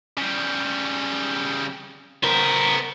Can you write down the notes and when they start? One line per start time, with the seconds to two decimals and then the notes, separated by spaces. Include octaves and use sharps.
0.18 C#3 G3
2.23 C#3 B3 A#4 C5